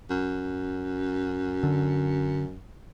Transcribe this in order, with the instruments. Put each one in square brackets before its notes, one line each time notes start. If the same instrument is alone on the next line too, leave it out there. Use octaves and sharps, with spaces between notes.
[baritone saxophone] F#2
[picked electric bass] D3